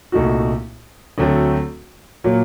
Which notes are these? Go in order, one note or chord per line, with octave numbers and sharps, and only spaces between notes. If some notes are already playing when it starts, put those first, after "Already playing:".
C2 A#2 A3 D#4 F#4
D2 D3 F#3 A3 C4
A#2 F#3 A#3